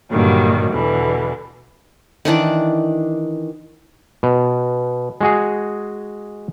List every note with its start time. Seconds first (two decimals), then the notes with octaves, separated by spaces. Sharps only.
0.11 G2 A#2 D3 D#3 F#3 G3
0.69 E2 B2 D3 E3
2.25 D#3 E3 D4 D5
4.23 B2
5.21 G#3 F#4 G#4